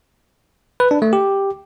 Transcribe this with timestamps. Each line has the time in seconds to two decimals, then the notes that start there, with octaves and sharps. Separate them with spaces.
0.80 B4
0.91 D4
1.02 A3
1.13 G4